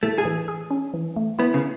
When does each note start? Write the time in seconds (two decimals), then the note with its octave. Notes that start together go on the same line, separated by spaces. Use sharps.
0.03 A2 A3
0.18 G#4
0.25 E3
0.48 G#4
0.71 C#4
0.94 E3
1.16 A3
1.39 B3 E4
1.54 C#3